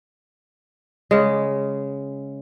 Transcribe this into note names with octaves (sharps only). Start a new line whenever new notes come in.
C#3 G#3